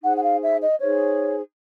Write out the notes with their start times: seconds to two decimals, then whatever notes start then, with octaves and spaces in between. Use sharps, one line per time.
0.02 D#4 G#4 C5 F#5
0.16 F#5
0.22 F5
0.41 E5
0.61 D#5
0.79 D#4 G#4 C5 C#5